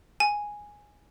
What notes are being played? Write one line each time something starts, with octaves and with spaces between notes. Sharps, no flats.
G#5